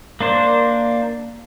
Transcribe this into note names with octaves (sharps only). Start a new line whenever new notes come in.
A#3 D4 C5